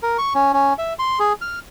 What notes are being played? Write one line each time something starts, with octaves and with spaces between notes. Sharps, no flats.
A#4
C#6
C#4
C#4
E5
C6
G#4
F6